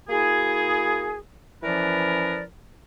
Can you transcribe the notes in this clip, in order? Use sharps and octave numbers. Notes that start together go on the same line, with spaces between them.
A#3 E4 F#4 G#4
E3 F3 C#4 A#4 B4 D5